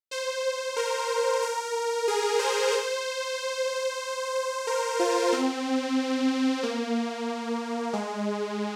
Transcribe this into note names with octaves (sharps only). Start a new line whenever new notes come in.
C5
A#4
A#4
G#4
C5
C5
A#4
F4
C4
A#3
G#3